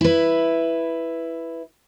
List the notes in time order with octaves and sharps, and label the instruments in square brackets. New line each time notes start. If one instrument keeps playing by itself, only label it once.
[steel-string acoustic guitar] E4 B4